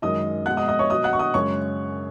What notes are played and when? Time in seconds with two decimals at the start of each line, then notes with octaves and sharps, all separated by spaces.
0.02 F#2 D#3 G#3 D#5 D#6
0.46 B2 G#3 F#5 F#6
0.57 D#5 D#6
0.68 D#5 D#6
0.79 C#5 C#6
0.90 B2 F#3 D#5 D#6
1.04 F#5 F#6
1.13 C#6
1.19 D#5 D#6
1.34 F#2 C#3 G#3 C#5 C#6